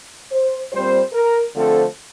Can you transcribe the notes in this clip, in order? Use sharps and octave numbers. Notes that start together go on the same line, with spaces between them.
C5
A#2 G3 C4 C5
A#4
D3 F3 A3 C4 A4